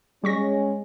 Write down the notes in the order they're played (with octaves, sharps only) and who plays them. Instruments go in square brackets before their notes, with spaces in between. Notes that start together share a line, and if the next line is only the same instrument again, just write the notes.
[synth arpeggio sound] G3 C#6 A#6 [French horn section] G#3 C#4